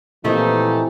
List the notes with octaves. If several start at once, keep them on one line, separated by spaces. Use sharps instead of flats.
A#2 E3 F3 A3 C4 D#4 E4 G4